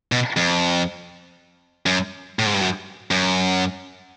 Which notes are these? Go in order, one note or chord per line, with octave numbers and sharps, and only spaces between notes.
B2
F2
F#2
A2
G#2
G2
F#2
F#2